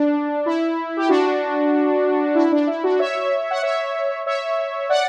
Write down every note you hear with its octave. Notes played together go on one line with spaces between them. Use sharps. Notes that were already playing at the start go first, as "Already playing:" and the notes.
Already playing: D4
E4
G4
D4 F#4
E4
D4
E4
D4 F#4
C#5 E5
F#5
C#5 E5
C#5 E5
D5 F#5